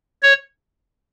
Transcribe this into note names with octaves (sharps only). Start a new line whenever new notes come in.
C#5